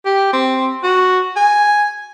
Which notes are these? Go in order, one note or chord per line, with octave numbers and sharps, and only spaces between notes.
G4
C4
F#4
G#5